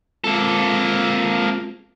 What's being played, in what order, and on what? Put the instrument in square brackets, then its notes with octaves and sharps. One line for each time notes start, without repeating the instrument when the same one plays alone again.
[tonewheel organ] G#3 C4 F4 [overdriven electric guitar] A#3 A4